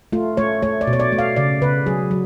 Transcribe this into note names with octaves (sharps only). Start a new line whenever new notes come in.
A3 F4
A3 C#5
A3 C#5
D5
B2
C#5
D5
A3
F5
C#3 D5
C#3 B4
F#3 G#4
F#3